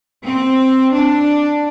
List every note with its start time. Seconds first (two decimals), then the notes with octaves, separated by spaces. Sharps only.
0.25 C4
0.94 D4